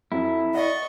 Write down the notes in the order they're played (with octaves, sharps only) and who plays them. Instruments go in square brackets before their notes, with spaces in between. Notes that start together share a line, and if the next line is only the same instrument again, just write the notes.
[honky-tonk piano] F2 F#3 [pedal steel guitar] E4
[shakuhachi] D5 [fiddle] D#5 C#6 [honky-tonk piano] F#5